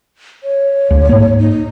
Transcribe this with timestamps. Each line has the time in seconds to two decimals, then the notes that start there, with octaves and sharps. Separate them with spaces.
0.43 C#5
0.91 D2
1.09 G#2 A#3
1.38 D#4